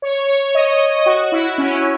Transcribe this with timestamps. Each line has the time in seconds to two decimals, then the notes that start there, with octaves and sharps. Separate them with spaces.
0.02 C#5
0.29 C#5
0.55 D#5
0.81 D#5
1.06 F#4
1.32 E4
1.58 C#4